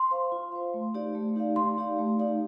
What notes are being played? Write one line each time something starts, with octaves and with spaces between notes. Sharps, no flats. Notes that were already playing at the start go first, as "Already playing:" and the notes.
Already playing: C6
C5 F5
F4
C5 F5
A3
D#4 G4 D5 F5
A3
D#4 G4 D5 F5
A3 C6
D#4 G4 D5 F5
A3
D#4 G4 D5 F5